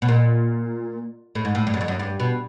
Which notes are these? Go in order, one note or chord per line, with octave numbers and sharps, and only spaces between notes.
B2
A#2
A2
G#2
A2
G2
F#2
F2
F#2
G2
B2